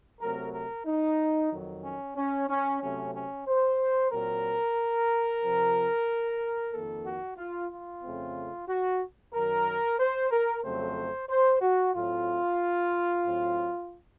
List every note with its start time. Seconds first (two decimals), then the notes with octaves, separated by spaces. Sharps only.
0.21 C3 F#3 A3 C4 A#4
0.53 A#4
0.86 D#4
1.52 F2 D#3 F#3
1.84 C#4
2.16 C#4
2.49 C#4
2.81 C3 F#3 A3 C4 C#4
3.14 C#4
3.47 C5
4.12 A#2 F#3 C4 A#4
5.43 F2 C3 F3 C4
6.73 F2 D#3 A#3 A4
7.05 F#4
7.37 F4
7.71 F4
8.03 F2 C#3 A3 C4
8.68 F#4
9.33 F#2 D#3 F#3 A#4
9.99 C5
10.31 A#4
10.64 F2 C#3 F#3 A3 C4 C5
11.29 C5
11.61 F#4
11.94 A2 F#3 A3 C4 F4
13.25 A2 F#3 C4